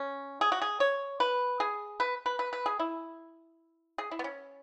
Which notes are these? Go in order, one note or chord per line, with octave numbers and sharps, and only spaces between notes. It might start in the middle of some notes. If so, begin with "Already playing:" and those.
Already playing: C#4
G#4
F#4
G#4
C#5
B4
G#4
B4
B4
B4
B4
G#4
E4
G#4
E4
B3
C#4